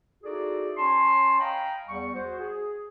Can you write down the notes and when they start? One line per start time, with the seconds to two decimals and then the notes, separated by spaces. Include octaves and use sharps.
0.23 D#4 E4 F#4 G#4 A4 D5
0.77 C#4 C#5 A5 C6
1.40 D#5 F5 G5 G#5 A#5 B5
1.88 E2 G3 C#6
2.14 F#4 G#4 C5
2.39 G#4